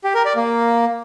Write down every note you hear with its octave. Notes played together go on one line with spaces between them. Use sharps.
G4
A#4
D5
A#3